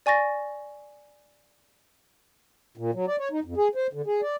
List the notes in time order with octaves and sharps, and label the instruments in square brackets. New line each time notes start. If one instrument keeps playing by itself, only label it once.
[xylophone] D5 G#5 C#6 A6 A#6
[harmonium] A#2
F#3
D5
C#5
D#4
F2
G#4
C5
D3
G#4
D5